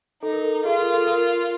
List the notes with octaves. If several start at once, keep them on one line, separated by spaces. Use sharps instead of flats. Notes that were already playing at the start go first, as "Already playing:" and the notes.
D#4 A4
A#4
A4
F4 G#4
A#4
A4
A#4